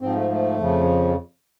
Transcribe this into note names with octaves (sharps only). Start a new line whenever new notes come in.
G#2 F3 C4
A3
A3
F2 C#3 F3